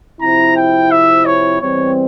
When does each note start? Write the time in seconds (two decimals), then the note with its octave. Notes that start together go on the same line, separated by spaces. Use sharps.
0.21 C3 F3 C4 E4 A#5
0.57 G5
0.91 E5
1.26 C#5
1.61 E2 E3 G3 C4 C#5